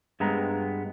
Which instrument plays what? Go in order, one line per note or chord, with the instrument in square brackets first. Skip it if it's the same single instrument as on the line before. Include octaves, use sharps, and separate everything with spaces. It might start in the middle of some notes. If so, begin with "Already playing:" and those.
[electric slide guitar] G2 G#3 B3 C4 A#5